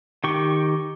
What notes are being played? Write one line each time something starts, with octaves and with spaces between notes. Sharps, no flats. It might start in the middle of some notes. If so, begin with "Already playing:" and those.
D#3 G4 C#6